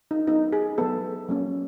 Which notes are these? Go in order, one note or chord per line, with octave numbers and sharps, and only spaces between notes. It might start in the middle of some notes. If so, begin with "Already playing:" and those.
D#4
F#3 B3 D#4
G#4
F#3 B3 A4
F#3 A#3 C#4